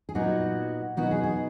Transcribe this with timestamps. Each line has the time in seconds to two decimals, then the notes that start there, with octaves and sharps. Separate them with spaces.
0.09 G#4
0.15 A#2 F#3 B3 D#4 F#4
0.97 B2 F#3 B3 D#4 F#4
1.11 G#4
1.24 G#4